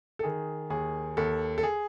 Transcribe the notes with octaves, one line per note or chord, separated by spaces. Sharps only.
A4
D#3 G#4
D#2 G#4
D#2 A4
A4
G#4